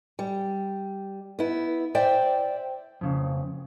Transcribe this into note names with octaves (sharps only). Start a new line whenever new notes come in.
G3
B3 E4
C5 D5 E5 G5
F2 C#3